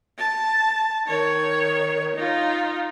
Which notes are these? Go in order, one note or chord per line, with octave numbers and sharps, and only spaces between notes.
A5
D#3 C#5
D#4 F4